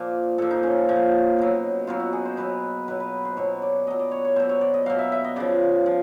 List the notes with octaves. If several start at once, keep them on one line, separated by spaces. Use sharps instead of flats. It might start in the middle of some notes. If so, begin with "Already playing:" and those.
Already playing: A#2 F3 D5
A#2 F3 A4
D#4
C#4
A#2 F3
B2 F#3
B2 F#3 F4
F#4
G#4
C5
B2 F#3 B4
B2 F#3 B4
B4
C5
B2 F#3 C#5
D5
B2 F#3 D#5
D5
C#5
C#5
B2 F#3 C5
C#5
D5
D#5
B2 F#3 F5
E5
E5
D#5
C#3 F3 D5
F3